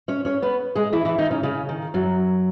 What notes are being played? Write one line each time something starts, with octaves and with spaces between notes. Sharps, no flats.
C#4 C#5
C#4 C#5
B3 B4
G#3 G#4
E3 E4
E3 E4
D#3 D#4
C#3 C#4
C#3 C#4
D#3
F#2 F#3